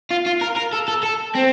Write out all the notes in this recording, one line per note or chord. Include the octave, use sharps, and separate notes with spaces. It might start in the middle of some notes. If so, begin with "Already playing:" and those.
F4
F4
A#4
A#4
A4
A4
A4
C4